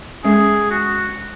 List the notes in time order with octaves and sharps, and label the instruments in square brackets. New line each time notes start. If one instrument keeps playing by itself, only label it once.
[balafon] G#3 C#4 [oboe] G#4
[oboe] F#4